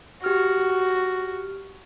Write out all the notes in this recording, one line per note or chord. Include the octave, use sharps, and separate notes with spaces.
F#4 G4 F6